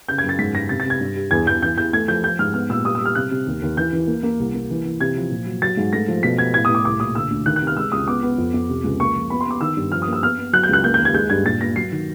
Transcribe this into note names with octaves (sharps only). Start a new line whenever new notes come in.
C#3 G6
G#6
F#2
A6
G#2 B6
G#2 A#6
C3 A6
A6
C3
G#6
G2
G3
E2 G#6
E2 G6
E3 G6
E2 G6
A3 G#6
F3 G6
F3 G6
G#2 F6
B3 F6
A#2 E6
G3 D#6
E6
G3
F6
C3 F#6
C3
D#2
D#2
E3 G6
E3
A#3
A#3
C2
A#3
E3
E3
C3 G#6
F3
A#2
F#3
F#3 A6
G#2
A3 A#6
F3
B2 B6
B3 G#6
A2 G#6
A2 D#6
D6
C2 D6
A#2 D#6
D3 E6
D2
D#3 F#6
F#6
C3
F6
G#3 E6
C#2 D#6
B3 D6
B3
F2
F2
C3
C#2
A#3 C#6
F3
B3 B5
C6
B3 D6
D#3 E6
G2
F3 F6
D#6
A#3
E6
B3 F6
B3
F#3 F#6
G6
C#2 F#6
A#3 G6
G6
D#2
G#6
G#3 G6
G2 G#6
A#2 A6
A#2 A#6
F#3 C7
D#3